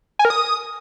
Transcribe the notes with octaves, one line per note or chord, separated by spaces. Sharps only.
G#5
A#4
D#6